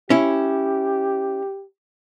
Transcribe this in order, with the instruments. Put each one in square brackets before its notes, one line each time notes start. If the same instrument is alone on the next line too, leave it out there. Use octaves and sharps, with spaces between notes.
[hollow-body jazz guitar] C#4 E4 [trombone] G4